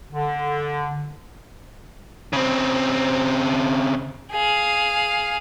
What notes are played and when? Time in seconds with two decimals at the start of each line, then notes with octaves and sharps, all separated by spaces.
0.12 D3
2.33 C#3 C4
4.31 G#4 F5